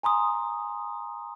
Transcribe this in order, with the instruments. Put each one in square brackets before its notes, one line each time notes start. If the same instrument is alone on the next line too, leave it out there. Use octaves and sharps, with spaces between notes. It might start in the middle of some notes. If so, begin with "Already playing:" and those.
[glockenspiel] G#5 A#5 C6 D#6